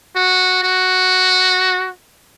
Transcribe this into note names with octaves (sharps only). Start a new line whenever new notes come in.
F#4
F#4